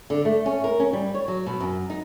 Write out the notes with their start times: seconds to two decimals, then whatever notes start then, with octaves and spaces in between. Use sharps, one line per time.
0.10 D3
0.25 A3
0.46 C#4
0.64 A#4
0.80 C#4
0.93 G3
1.15 C#5
1.28 F#3
1.46 B2
1.60 F#2
1.90 D#4